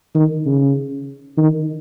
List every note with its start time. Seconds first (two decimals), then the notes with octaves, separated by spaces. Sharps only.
0.15 D#3
0.46 C#3
1.38 D#3